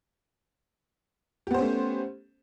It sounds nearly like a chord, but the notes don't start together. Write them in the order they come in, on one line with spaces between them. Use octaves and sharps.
G4 B3 C5 C#4 A3